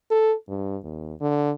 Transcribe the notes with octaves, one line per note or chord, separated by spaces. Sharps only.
A4
G2
D#2
D3